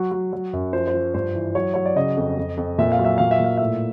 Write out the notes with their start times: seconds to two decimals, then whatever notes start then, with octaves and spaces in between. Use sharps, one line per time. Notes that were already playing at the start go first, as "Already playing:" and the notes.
Already playing: F#3 F#4
0.12 F#3
0.33 F#3
0.53 F#2
0.73 F3 C5
0.88 C5
0.94 F3
1.14 G2 C5
1.35 E3
1.55 F#3 C#5
1.74 F#3 C#5
1.86 D5
1.96 C#3 D#5
2.17 F2
2.38 F2
2.57 F2
2.78 A#2 E5
2.92 F5
2.99 F#3
3.04 E5
3.18 A#2 F5
3.31 E5
3.40 A#2 F5
3.57 A2 E5